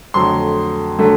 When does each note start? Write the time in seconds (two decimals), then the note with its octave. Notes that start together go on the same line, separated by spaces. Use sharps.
0.14 F2 D3 F#3 A3 C6
0.99 D3 F#3 A3